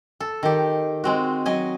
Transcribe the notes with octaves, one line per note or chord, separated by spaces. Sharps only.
A4
D#3 G4
G#3 C4 F#4
F#3 D#5 G#5